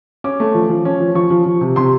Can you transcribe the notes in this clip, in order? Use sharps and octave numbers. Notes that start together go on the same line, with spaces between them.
C#4 D6
A3
F3
F3
C#4
F3
F3 C#6
F3
F3
C3
C3 C6